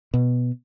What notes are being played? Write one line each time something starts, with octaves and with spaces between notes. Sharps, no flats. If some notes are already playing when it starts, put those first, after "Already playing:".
B2